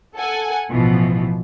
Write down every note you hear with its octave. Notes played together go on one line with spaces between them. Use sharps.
A4 F#5 G#5
A1 B2 E3 F3